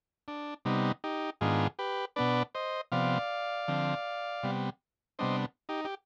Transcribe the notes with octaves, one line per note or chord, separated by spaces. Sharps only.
D4
C3 G3 B3 D#4
D#4 G4
G#2 D#3 B3 D4 F4 G#4
G4 B4
B2 B3 D4 B4 D5
C5 D#5
C3 F3 B3 D5 F5
D3 F3 C4
C3 G3 B3
C3 G3 B3 D4 C5 D#5
D#4 G4
G4